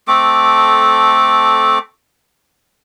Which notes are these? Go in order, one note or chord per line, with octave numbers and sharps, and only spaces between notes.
A3 C4 A4 D6